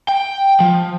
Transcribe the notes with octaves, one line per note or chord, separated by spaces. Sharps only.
G5
F3